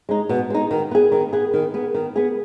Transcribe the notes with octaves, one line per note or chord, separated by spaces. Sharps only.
G#3 D#4
B2
G#3 D#4
D#3
B3 G#4
D#3
B3 G#4
D#3
B3 G#4
D#3
B3 G#4